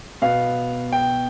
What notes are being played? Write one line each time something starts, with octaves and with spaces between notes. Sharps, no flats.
B2 B3 F5
G5